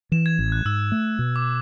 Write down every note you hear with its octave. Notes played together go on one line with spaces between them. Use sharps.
E3 E7
G#6
A1
F#6
G#2 E6
A3
B2
D6